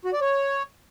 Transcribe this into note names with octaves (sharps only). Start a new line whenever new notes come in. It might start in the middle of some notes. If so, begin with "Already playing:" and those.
F#4
D5
C#5